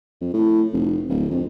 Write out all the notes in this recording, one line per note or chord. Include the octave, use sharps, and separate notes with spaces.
F2
A2
F1
D1
F2